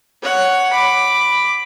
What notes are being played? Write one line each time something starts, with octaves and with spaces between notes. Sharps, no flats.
C#5 F#5
B5 D6